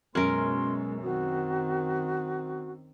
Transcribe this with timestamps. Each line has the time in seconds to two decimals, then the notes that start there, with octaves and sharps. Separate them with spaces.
0.15 F#2 B2 G#3 C#4 A#4 C6
1.03 D#3 C4 F#4